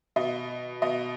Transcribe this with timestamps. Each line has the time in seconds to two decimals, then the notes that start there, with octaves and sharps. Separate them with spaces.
0.16 B2 D#5
0.82 B2 D#5